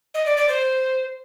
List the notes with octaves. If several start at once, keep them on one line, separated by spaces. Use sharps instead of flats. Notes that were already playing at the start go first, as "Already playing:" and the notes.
D#5
D5
D5
C5